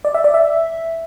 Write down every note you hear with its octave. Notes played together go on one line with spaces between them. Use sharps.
D5
E5
D5
E5